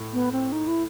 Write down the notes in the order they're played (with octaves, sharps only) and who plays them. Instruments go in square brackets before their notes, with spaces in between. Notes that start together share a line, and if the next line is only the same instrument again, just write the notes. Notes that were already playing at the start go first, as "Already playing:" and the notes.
Already playing: [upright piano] A2
[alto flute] B3
C4
D#4
E4